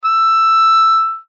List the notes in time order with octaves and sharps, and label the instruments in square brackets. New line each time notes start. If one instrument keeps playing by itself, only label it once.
[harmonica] E6